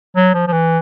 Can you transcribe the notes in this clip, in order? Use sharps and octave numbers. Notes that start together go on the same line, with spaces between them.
F#3
F3
F3
E3